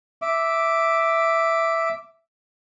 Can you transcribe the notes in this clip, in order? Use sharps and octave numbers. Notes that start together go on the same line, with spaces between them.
E5 D6